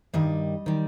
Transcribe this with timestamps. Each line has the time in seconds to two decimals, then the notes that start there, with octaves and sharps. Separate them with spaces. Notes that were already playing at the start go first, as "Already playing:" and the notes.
0.13 G2 D#3 G3 D#5
0.66 D#3 G3